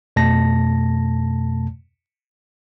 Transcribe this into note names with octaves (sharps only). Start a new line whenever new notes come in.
F2 B2 A3 A5 A#6